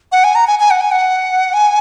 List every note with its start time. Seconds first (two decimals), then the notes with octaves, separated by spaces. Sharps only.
0.12 F#5
0.24 G#5
0.35 A#5
0.47 G#5
0.59 G#5
0.71 F#5
0.81 G#5
0.91 F#5
1.53 G#5